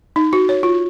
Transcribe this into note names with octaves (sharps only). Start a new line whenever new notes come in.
D#4
F#4
C#5
F4